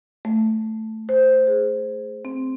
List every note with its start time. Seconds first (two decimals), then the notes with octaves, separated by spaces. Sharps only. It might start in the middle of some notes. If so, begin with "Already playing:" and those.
0.25 A3
1.09 C5
1.47 G#4
2.25 C4